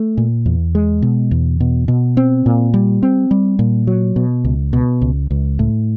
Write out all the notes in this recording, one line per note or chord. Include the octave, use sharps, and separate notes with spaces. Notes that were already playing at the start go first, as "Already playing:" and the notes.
Already playing: A3
A#2
E2
G#3
B2
E2
B2
B2
C4
A#2
G3
C4
G3
A#2
F#3
B2
C#2
B2
C#2
C#2
A2